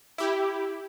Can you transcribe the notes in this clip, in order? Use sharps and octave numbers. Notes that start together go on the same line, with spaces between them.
E4 G4